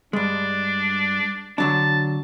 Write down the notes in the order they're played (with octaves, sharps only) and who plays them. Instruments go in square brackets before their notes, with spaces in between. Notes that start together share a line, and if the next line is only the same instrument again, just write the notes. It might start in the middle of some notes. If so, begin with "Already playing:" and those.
[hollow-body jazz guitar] G2 G#3 [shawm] D4
[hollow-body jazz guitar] D3 F#3 D4 [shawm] A5